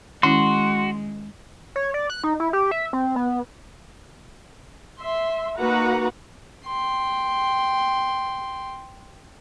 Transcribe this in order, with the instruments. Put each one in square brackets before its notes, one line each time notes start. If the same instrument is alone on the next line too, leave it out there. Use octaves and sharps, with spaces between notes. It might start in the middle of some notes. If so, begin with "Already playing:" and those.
[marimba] D#3 C#4 E4 [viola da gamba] G#3 [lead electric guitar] F#4 [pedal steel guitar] C6
[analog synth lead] C#5
D5
F#6
D#4
E4
G4
E5
C4
B3
[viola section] E5 C6
A#3 D#4 F#4 B4 F#5 A#5
[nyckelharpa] G5 C6